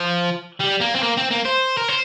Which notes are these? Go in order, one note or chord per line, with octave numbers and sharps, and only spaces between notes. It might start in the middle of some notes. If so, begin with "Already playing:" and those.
Already playing: F3
G3
A#3
C4
A#3
C4
A#3
C5
A#4
C5